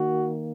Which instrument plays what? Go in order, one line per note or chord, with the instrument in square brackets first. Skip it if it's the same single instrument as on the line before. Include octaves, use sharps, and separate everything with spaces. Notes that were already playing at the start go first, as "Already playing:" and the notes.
Already playing: [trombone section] D#3 A#3 F#4